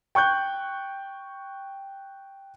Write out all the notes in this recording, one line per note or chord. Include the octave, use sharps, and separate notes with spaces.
G5 C#6 F#6 G6